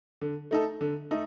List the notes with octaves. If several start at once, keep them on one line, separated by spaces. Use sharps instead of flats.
D3
A3 D#4 A4
D3
A3 D#4 A4